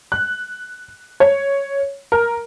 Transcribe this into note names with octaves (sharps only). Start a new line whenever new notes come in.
F#6
C#5
A#4